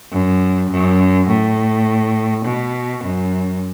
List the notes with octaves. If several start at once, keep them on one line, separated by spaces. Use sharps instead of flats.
F#2
F#2
A2
B2
F#2